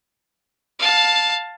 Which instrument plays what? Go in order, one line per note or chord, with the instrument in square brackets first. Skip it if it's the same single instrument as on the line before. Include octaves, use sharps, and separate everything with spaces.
[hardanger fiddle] F5 A5